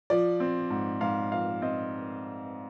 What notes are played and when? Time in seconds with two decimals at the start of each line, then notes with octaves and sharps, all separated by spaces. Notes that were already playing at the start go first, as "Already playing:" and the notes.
0.10 F3 D5
0.40 C4
0.70 G#2
1.01 G#2 F5
1.32 F3 F5
1.62 C4 D#5